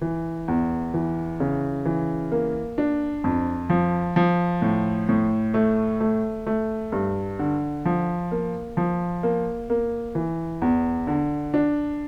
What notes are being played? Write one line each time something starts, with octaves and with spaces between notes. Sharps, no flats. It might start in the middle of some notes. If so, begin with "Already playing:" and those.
E3
E2
E3
C#3
E3
A#3
D4
F2
F3
F3
A2
A2
A3
A3
A3
G2
D3
F3
A#3
F3
A#3
A#3
E3
E2
D3
D4